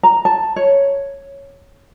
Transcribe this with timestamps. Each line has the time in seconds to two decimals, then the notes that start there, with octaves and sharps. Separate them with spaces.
0.03 A#5
0.25 A5
0.56 C#5